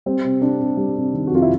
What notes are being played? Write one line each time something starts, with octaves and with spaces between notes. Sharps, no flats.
G3 C4
C3
C3 D4
C3
G3
C3
D#3
F#4
F2 F4
E4